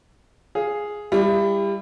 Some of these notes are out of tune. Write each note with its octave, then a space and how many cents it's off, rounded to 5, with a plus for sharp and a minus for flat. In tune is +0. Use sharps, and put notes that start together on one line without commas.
G#4 +0 F5 +0
G3 +25 E4 +35